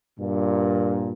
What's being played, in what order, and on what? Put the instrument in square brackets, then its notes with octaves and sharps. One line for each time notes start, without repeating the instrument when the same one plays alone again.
[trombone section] G2 A#2